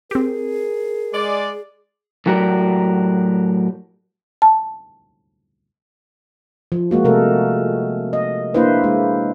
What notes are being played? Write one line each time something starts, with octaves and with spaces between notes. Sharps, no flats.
C4 G4 G#4 A#4
G#3 D5
A2 F#3 F#4 G4 A#4 D5
A5
F3
G#3 A#3 F#4
C3 A3 A4 A#4
D#5
A#3 D4 E4 B4 C5
G#3